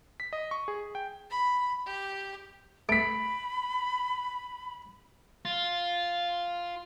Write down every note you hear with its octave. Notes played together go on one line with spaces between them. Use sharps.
B6
D#5
C#6
G#4
G5
B5
G4
A3 B5 B6 D7
F4